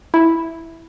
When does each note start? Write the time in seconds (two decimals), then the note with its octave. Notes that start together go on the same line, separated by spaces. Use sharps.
0.14 E4